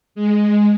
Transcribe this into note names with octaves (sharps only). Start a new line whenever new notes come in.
G#3